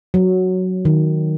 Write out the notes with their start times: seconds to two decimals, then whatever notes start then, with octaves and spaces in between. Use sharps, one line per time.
0.14 F#3
0.85 D#3